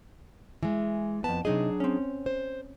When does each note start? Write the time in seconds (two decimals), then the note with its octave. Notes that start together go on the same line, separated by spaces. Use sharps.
0.63 E3 G#3
1.24 F2 B3 A5
1.45 C3 F#3 D4 D#4 G#4 D#5
1.80 C4 C#4
2.26 C5